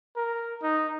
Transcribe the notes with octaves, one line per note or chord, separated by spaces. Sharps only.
A#4
D#4